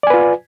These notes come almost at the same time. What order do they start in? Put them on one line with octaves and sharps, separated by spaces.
D5 G#5 B4 F4